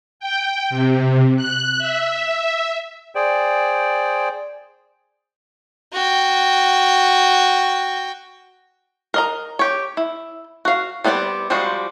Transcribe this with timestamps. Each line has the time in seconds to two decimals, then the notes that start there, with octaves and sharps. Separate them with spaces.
0.20 G5
0.70 C3
1.36 F#6
1.78 E5
3.15 G#4 C5 D5 G5
5.93 F#4 G5
9.14 A#4 D#5 A#5
9.59 G4 C#5
9.97 E4
10.65 F#4 F5
11.04 G3 B3 C4 E4 D5
11.50 F3 G3 G#3 C4 F#4